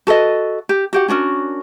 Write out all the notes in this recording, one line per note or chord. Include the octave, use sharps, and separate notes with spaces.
F#4 A4 B4 D#5
G4
F#4 G4 F#5
C#4 D4 F#4 A#4